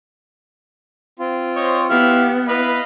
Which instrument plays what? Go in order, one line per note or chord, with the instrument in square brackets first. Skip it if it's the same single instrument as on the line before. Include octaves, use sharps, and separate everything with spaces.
[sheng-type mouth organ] C4 F4
[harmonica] C5 C#5 D#5
[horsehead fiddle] B3 [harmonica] E4 F5 F6 [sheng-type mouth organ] G4
[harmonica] E4 B4 [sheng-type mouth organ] D#5 F5 B5